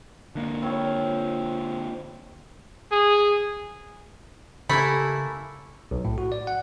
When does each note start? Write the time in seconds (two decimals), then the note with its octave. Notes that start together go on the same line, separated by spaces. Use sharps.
0.35 D3 A#3
0.62 C4 F4 C#5
2.92 G#4
4.69 C#3 A3 A#3 E4 G4 A4 G#5 B5
5.91 B1
6.05 A2
6.18 F#4
6.32 D5
6.47 F#5